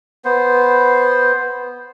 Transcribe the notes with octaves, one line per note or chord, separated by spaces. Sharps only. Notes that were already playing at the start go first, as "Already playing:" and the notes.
B3 C5